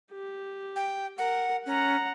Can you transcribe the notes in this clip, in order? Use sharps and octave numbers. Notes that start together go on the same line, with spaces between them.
G4
G5
A#4 F#5
C#4 F#5 A#5